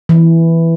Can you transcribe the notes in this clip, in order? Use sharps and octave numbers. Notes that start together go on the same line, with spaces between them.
E3